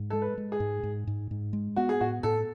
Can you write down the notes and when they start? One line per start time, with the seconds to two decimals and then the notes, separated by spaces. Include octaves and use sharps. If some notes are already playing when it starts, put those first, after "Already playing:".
Already playing: G#2
0.10 G#3 A4
0.22 B4
0.38 G#3
0.52 G#4
0.60 G#2
0.83 G#2
1.07 G#2
1.31 G#2
1.53 G#3
1.76 B3 F#4
1.89 G#4
2.01 A2 F#4
2.23 A2 A4